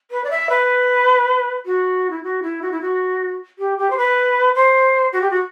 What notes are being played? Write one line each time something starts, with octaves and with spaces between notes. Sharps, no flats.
B4
D5
E5
B4
F#4
E4
F#4
E4
F#4
E4
F#4
G4
G4
C5
B4
C5
F#4
G4
F#4